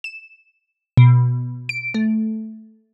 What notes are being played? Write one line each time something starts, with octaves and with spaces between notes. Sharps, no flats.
E7
B2
D7
A3